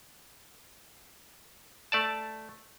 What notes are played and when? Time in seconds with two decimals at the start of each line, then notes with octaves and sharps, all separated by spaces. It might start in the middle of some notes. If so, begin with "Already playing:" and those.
1.92 A3 D5 A5